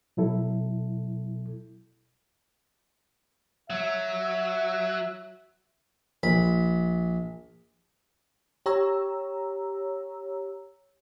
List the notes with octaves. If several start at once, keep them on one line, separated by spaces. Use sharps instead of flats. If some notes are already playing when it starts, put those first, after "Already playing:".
B2 F#3 E4 A4
F#3 E5
A#1 B5
G4 C#5 A#5 E6